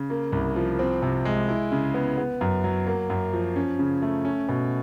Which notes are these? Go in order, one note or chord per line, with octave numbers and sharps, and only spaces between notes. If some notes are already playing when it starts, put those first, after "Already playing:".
Already playing: C#3
A#3
C2
F3
C4
C3
G#3
E4
C#3
B3
B3
F#2
F#3
A#3
F#2
F3
C#4
C#3
A3
C#4
B2